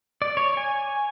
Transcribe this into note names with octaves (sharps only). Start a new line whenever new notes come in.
D5
C#5
G#5